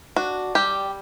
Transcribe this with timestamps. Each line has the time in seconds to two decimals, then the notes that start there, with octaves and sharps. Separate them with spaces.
0.16 D4 F#4
0.55 G3 G4